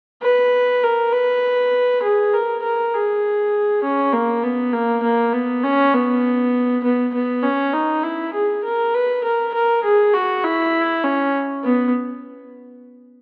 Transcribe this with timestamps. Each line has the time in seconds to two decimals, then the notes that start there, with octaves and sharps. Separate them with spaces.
0.22 B4
0.83 A#4
1.12 B4
2.02 G#4
2.33 A#4
2.62 A#4
2.94 G#4
3.83 C#4
4.13 A#3
4.43 B3
4.73 A#3
5.03 A#3
5.33 B3
5.64 C#4
5.94 B3
6.84 B3
7.14 B3
7.43 C#4
7.73 D#4
8.03 E4
8.33 G#4
8.64 A#4
8.94 B4
9.24 A#4
9.54 A#4
9.83 G#4
10.14 F#4
10.44 E4
11.04 C#4
11.64 B3